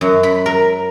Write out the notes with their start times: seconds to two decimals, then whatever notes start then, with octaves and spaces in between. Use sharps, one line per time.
0.01 F#2
0.23 B5
0.46 A#4